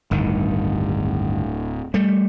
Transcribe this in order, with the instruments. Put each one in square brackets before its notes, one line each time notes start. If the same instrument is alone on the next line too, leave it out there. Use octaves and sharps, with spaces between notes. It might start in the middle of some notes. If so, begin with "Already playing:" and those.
[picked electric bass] D1 [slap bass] G1 D#3
[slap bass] G3 A3